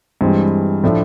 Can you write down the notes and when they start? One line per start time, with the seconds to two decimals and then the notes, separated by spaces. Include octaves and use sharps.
0.21 G2 E3 G#3 C4
0.83 A2 F3 A3 D4